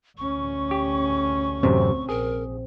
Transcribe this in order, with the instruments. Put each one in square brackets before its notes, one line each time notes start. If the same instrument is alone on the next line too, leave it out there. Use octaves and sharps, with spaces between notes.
[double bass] D2 C#4 [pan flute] C#6
[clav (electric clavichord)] G4
[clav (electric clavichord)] A1 F#2 C3 [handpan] C4
[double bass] A#1 [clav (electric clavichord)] G#4 [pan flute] A#4